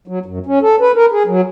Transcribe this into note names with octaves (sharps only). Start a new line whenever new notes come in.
F#3
F#2
C#4
A4
B4
A#4
G#4
F#3